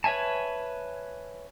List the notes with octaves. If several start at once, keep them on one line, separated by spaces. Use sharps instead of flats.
B4 C#5 E5 G#5 A5